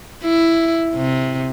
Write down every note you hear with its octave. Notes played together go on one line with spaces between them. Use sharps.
E4
C3